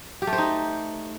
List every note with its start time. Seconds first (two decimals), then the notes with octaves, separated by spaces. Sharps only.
0.22 G4
0.27 A3
0.33 C5
0.38 D#4